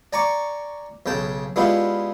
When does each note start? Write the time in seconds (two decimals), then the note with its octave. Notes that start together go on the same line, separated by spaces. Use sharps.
0.13 D5 G#5 A#5 C#6 D6
1.06 B1 C#3 G5 A5
1.56 G#3 B3 D4 E4 F4 G4